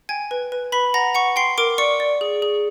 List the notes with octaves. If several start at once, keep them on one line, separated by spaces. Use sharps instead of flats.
G5 G#5 G#6
B4
B4
B4 B5 B6
F#5 A#5 A#6
F#5 C#6 C#7
G5 C6 C7
A#4 D6 D7
D5 C#6 C#7
D5
G#4
G#4